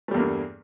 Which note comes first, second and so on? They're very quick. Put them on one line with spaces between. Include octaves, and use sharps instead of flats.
A3 G3 E2 A#3 G2